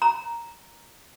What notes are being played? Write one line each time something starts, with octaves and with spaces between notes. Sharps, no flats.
A#5